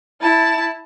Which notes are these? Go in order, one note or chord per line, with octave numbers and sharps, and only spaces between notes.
E4 A5